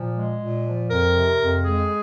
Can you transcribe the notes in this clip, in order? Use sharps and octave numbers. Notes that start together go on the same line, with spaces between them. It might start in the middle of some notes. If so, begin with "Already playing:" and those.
Already playing: A#2 F3
G#3
A#2
F3
F2 A#4
C3
F2
G#3 G#4